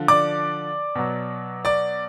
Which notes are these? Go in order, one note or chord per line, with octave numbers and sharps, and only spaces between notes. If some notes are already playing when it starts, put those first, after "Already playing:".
Already playing: D3 F3
D5 D6
B2 F#3
D5 D6